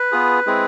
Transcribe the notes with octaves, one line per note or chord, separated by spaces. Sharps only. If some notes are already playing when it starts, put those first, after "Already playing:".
Already playing: B4
B3 F4 G#4
G#3 C4 E4 G#4